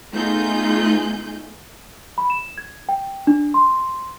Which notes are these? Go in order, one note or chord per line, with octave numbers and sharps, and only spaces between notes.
A3 B3 D#4 F4 G#4 G6
B5
E7
G#6
G5
D4
C6